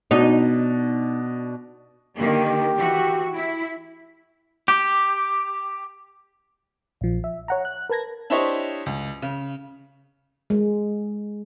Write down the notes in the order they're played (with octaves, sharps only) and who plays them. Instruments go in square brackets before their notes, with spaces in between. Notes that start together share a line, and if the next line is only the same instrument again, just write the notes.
[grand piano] B2 D4 [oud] D#4
[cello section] D3 D#3 A#3 [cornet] G4
[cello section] E3 F#4
E4
[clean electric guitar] G4
[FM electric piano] A#1 F3
E5
C#5 F#5 A#5
F#6
A#4 B4 A5 G#6 A#6
[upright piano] D4 E4 G4 C5 C#5 D#5
C#2
C#3
[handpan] G#3